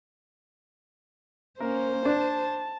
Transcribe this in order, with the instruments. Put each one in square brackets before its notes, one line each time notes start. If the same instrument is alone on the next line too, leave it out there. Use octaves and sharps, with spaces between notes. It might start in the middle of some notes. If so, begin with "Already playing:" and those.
[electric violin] A#3 C#4 [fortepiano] A#4 [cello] C5
[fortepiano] D4 [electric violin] A5